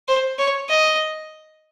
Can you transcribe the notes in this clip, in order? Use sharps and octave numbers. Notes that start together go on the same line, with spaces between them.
C5
C#5
D#5